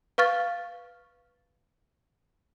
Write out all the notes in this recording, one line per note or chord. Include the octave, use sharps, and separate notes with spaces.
B4 F5 C#6 F6 A6